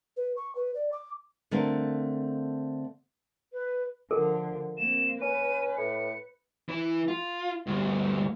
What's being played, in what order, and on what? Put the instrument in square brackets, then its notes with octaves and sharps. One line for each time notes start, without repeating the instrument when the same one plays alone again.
[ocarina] B4
C#6
B4
D5
D6
[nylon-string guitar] D3 A3 C4 A#4 F5
[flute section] B4
[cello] D3 F3 [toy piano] A4 A#4
[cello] A#3 C4 [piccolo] E7
[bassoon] C#4 [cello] B4 [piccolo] D#7
[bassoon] A2 [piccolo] C#7
[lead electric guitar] E3
F4
D2 G2